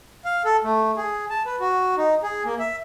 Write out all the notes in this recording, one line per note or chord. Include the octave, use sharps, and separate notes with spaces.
F5
A4
A3
G#4
A5
B4
F#4
D#4
G#4
A#3
E5